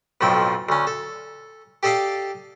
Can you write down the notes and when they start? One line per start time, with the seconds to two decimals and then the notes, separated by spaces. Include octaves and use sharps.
0.21 B1 F2 A2 F3 G5
0.69 D2 C#4
0.87 A4
1.83 G4 A4 D5 D#5 F5 A5